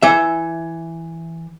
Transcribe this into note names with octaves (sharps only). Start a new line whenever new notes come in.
E3 E5